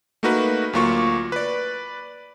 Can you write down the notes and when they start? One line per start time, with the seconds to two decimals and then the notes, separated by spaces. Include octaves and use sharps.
0.23 A3 A#3 D#4 F#4 A#4 B4
0.73 D2 F#3 A#3 F4 C#6
1.32 B4 D5